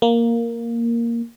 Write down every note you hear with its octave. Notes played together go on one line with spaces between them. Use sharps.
A#3